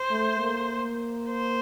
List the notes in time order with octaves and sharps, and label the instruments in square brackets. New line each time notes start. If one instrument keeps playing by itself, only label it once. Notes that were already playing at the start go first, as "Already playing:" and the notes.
Already playing: [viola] C5
[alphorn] A3
A#3
[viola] C5